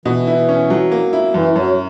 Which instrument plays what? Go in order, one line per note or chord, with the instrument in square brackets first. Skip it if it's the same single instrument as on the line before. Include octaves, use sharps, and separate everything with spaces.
[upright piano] B2 [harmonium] E3
[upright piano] E4
C#4
F#3
A#3
E4
[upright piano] F#2 [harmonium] E3
[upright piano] F#2 [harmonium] F#3